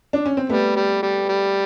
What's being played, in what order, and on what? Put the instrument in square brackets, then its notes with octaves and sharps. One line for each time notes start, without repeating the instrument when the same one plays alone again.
[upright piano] D4
C#4
C4
[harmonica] G3 [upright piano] A3 B3
[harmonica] G3
G3
G3